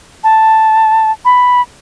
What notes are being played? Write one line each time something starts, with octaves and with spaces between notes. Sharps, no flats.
A5
B5